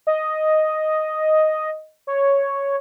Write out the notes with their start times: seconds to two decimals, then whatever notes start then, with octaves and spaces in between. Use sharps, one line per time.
0.07 D#5
2.07 C#5